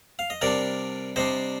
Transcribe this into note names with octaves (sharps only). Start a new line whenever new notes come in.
F5
D#5
C3 G3 D4 A#4 D5
C3 G3 D4 C5 D#5